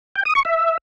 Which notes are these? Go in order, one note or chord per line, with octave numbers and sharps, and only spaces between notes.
G5
D#6
C#6
E5